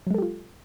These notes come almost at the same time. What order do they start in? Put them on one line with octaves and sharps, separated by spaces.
F#3 G#3 A4 G4 F4